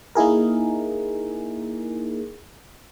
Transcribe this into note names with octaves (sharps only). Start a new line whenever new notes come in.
A#3 D#4 E4 G#4 A#4